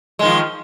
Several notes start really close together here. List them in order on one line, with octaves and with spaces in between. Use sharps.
G#3 D#3 F3